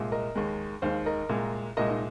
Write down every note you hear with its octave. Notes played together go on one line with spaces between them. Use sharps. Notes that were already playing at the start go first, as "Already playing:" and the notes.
Already playing: C2 A#2 G#3
A#4 D#5
D#2 D#3 G#3
D#2 D#3 G#3 C5 F5
A#4 D#5
C2 A#2 G#3
C2 A#2 G#3 A#4 D#5
D#4